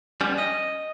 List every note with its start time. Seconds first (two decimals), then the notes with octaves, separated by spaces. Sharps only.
0.21 G3 B3 C#4
0.38 D#5